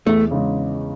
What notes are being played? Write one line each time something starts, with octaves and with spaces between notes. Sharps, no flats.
E2 A3
C#3 G#3